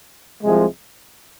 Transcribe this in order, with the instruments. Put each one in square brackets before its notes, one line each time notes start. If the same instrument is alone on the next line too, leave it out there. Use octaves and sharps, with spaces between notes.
[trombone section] C2 C3 F3 G#3